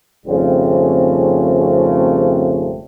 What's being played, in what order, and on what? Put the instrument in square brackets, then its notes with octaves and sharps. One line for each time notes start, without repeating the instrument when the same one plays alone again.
[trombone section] G#1 F2 C#3 G3 A3 C4